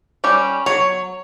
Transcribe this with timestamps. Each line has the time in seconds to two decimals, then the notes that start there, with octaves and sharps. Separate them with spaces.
0.24 G3 C#4 G4
0.66 F#3 C#5